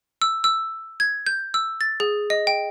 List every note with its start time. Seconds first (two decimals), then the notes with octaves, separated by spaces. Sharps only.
0.22 E6
0.44 E6
1.00 G#6
1.26 G6
1.54 E6
1.81 A6
2.00 G#4
2.30 D#5
2.47 G5